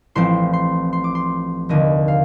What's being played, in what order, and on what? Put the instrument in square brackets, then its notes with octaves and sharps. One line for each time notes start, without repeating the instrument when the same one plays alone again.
[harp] A1 A2 F3 C4 C6
C6
C6
D6
C6
F1 D#2 D3 D#5
F5